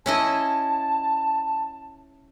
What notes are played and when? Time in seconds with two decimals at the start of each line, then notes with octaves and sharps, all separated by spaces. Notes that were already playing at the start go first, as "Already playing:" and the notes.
0.06 C#4 E4 D#5 A5